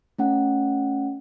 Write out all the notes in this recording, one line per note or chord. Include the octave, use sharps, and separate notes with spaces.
A3 C#4 F#5